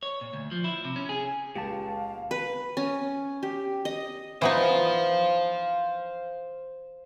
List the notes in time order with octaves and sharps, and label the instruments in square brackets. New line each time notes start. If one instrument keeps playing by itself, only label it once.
[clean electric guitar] C#5
A#2
D2
F3
E4
C3
C#4
G#4
[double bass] C#2 [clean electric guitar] A#2 G#3 A5 [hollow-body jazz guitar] G4 [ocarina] F5
[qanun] B4
C#4
G4
D#5
[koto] E3 B3 D#4 [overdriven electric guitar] C5 F5